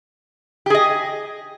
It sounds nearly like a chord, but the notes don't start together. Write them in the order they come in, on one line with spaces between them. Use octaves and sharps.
G4 G#4 D#5